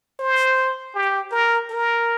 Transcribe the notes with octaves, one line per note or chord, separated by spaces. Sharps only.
C5
G4
A#4
A#4